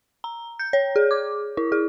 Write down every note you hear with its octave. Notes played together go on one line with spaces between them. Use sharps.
A#5
G6
C#5
G#4
D6
E4
G#4